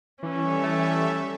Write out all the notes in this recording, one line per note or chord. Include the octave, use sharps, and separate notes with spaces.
E3 G3 C#4 A4 E5
A3